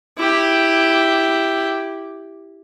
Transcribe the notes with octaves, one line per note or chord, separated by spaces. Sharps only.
E4 G4